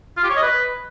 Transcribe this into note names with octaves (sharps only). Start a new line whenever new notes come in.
F4
G4
C#5
D#5
B4